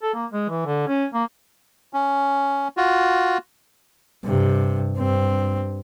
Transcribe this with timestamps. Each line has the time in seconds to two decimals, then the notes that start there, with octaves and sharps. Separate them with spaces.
0.02 A4
0.14 A#3
0.32 G#3
0.49 E3
0.66 D3
0.87 C#4
1.14 A#3
1.93 C#4
2.77 F4 F#4
4.24 G2 C3
4.96 G2 C4